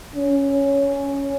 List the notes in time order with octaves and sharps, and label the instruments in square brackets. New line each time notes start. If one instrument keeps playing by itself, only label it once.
[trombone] C#4